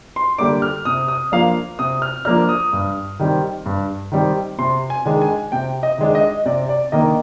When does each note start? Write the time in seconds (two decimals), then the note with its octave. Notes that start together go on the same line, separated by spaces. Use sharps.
0.16 C6
0.38 D3 G3 A#3 D4 D6
0.62 F6
0.85 C3 D#6
1.08 D#6
1.32 F3 A#3 D4 F5
1.79 C3 D#6
2.02 F6
2.25 F3 A#3 D4 F6
2.49 D#6
2.73 G2
3.19 D#3 G3 C4
3.66 G2
4.12 D#3 G3 C4
4.59 C3 C6
4.90 G#5
5.05 D#3 G#3 D4
5.22 G#5
5.52 C3 G5
5.83 D#5
5.98 D#3 G#3 D4
6.15 D#5
6.46 C3 D5
6.69 D5
6.92 D#3 A#3 D4 D#5